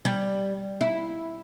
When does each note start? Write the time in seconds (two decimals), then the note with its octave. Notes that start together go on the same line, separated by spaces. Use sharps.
0.05 G3
0.81 E4